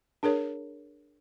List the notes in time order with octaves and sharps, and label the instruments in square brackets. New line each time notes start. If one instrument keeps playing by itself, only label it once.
[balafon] D4 G#4 A#4 C#5